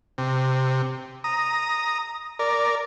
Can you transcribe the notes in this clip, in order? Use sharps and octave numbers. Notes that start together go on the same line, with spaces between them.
C3
A#5 D#6
A#4 D5